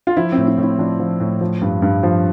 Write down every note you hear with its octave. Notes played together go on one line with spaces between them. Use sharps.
F4
F3 E4
C4
A2
E4
A2
E4
F3 D4
F3
A2
F3
G2
G2
F3